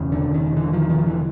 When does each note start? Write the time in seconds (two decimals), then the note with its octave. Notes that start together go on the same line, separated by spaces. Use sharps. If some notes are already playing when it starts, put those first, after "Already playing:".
Already playing: E1 E2 C#3
0.12 D3
0.34 D#3
0.57 D3 E3
0.73 D#3 F3
0.89 D#3 F3
1.06 D3 E3